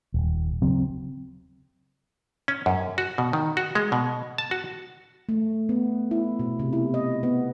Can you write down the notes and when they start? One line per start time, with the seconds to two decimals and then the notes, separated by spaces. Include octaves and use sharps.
0.14 D#1
0.62 C#3 F#3 C4
2.48 C#4
2.66 F#2
2.98 F#4
3.18 B2
3.33 D#3
3.57 F#4
3.75 G#3
3.92 B2
4.38 A5
4.51 F#4
5.29 A3
5.69 B3
6.11 E4
6.39 B2
6.59 C3
6.73 E4
6.94 D#5
7.23 B3